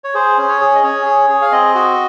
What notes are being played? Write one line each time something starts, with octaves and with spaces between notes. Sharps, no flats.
C#5
G#4 C5
C#4 C5
C#5
G#4
D#5
C#4 C#5
G#4
G#4
F5
C4 D#5
F#4